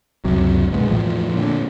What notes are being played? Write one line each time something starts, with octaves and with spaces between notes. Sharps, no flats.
C#2 F#2 C3 F#3
A#1 B2 D3 G#3
E2 A2 E3 F3
A#2 D3